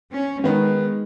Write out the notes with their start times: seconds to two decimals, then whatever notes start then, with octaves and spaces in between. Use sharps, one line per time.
0.12 C#4
0.44 D#3 G#3 B3